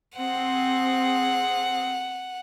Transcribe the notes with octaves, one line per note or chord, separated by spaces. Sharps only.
C4 G#4 F#5